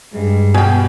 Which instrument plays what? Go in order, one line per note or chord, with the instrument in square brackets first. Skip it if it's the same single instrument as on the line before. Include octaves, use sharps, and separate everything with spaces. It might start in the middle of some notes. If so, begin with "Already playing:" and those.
[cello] G2 [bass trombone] G#3
[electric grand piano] B2 G3 [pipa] G#4 G5